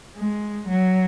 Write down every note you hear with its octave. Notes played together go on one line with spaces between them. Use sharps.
G#3
F#3